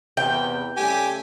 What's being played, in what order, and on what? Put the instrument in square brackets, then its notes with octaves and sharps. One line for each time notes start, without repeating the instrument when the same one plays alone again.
[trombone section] E2 C3 E3 [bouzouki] G5
[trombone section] C#3 G3 A3 [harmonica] G4 G#5